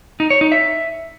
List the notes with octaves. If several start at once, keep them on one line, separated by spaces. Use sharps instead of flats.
D#4
C#5
D#4
E5